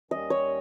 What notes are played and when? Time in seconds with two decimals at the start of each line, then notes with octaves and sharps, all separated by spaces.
0.11 D#2 D#3 G3 C#4 D#5
0.30 C#5